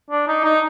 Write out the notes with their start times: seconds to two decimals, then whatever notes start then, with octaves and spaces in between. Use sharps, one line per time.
0.11 D4
0.28 D#4
0.44 D#4